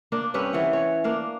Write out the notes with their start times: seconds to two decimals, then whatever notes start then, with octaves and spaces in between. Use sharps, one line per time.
0.12 A#3 D4
0.34 G2 C4 C#4 B4
0.53 E3 F#5
0.73 C#5
1.04 A#3 D4 F5